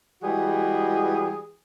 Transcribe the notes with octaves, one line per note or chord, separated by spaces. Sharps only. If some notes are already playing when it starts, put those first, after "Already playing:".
E3 G3 G#3 F#4 G#4